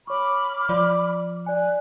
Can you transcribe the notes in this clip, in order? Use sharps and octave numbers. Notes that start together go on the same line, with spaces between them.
C#5 B5 C#6 D6 F6
F3 D5
D5 G#5 F#6